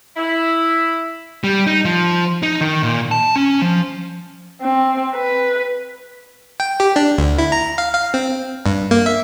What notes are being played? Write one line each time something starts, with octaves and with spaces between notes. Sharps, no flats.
E4
G3
D#4
F3
D#4
D#3
A#2
A5
C#4
F3
C4
B4
G5
G4
D4
D2
E4
A#5
F5
F5
C4
G2
A#3
E5